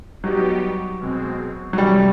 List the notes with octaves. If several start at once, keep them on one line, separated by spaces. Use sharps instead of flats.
F#3 G3 B3 D#4 G4
B2 G#3 C4
F#3
C3 E3 G3 A3 C#4